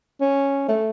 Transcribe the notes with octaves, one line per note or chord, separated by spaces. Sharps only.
C#4
A3